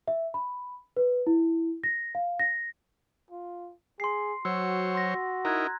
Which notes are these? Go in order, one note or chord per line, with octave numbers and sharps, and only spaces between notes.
E5
B5
B4
E4
A#6
F5
A#6
F4
G#4 C6 C7
F#3 F#4 C5 C#5 E6
C6 A#6
D#4 E4 A#4 A#5 F#6 G#6